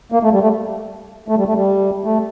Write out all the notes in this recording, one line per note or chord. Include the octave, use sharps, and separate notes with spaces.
A#3
A3
G3
A3
A3
G3
A3
G3
A3